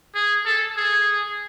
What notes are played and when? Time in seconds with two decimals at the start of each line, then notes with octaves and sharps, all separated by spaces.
0.15 G#4
0.45 A4
0.77 G#4